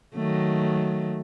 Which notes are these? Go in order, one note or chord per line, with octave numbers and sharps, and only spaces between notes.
D#3 F#3 A3